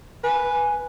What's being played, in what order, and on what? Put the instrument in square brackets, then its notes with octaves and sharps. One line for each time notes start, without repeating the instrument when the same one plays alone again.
[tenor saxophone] B4 [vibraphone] G#5